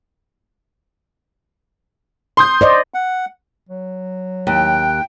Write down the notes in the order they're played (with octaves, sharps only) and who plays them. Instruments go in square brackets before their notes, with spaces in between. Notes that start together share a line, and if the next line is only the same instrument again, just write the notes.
[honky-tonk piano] C6 D#6 G6
[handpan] C5 D5 D#5
[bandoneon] F#5
[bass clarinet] F#3
[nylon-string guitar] D#2 [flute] G5 [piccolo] F#6